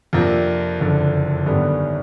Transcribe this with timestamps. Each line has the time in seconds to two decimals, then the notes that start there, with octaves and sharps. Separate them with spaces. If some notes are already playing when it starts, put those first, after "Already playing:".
0.13 F2 C3 F3 A#3 D4
0.79 F#1 F2 D3
1.46 G#1 F#2 D3 G3 B3